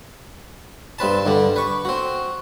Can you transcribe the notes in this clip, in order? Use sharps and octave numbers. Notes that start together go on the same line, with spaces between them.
G2 C4 B4 A5
G2 D3 G3
B4 C#6
C4 F#4